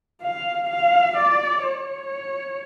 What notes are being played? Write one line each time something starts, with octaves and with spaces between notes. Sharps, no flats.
F5
F5
D5
C#5